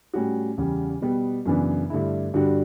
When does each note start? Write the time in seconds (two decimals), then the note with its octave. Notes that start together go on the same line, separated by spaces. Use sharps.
0.14 A2 G3 C#4 F#4
0.58 E2 C#3 G3
1.02 B2 G3 B3
1.46 F#2 C#3 E3 B3 D4
1.90 G2 D3 A3 E4
2.34 G2 D3 G3 D4 F#4